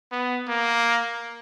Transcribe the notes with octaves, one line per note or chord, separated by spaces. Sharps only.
B3
A#3